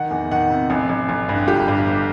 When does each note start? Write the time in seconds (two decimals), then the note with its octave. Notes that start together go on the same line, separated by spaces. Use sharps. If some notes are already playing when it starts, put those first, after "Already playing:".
Already playing: D#3 F#5
0.11 E2
0.31 D#3 F#5
0.50 C3
0.70 A1
0.89 A1
1.09 A1
1.29 G2
1.47 G1 G4
1.68 G2
1.87 G1